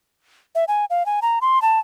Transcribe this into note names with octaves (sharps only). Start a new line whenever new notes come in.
E5
G#5
F5
G#5
A#5
C6
A5